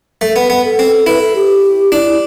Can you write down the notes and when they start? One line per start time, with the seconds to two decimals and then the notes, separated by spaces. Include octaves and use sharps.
0.21 A3
0.36 B3
0.50 B3
0.64 A4
0.79 C4
1.06 E4 B4
1.21 A4
1.35 G4
1.92 D4 E4